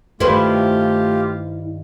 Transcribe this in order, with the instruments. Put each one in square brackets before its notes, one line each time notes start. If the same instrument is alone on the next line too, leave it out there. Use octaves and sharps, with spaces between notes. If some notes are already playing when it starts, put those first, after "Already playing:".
[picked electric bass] G2 D#3 [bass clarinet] A3 [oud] E4 B4 C5 [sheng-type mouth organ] F4 G4